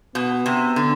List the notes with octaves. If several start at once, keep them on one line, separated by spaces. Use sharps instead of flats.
B2 B3
C3
D3